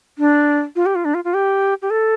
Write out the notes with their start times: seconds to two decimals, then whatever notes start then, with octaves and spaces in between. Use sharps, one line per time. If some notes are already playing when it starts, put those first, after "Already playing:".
0.18 D4
0.76 F4
0.86 G4
0.95 F4
1.05 D4
1.14 F4
1.24 F4
1.34 G4
1.82 G4
1.90 A4